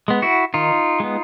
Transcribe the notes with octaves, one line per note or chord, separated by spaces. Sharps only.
G#3 B3
E4 F#4
D#3 D#4 F4
G#3 B3